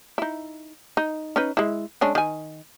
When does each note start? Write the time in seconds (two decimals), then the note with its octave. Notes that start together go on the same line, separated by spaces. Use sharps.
0.18 D#4 E4
0.97 D#4
1.36 C#4 D#4 B4
1.57 G#3 E4
2.01 G#3 C#4 D4
2.15 D#3 G#5